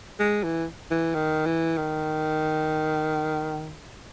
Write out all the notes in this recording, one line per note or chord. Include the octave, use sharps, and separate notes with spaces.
G#3
E3
E3
D#3
E3
D#3